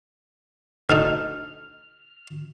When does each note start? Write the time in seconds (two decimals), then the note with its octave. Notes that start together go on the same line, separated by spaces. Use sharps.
0.90 D2 D3 D#4 F6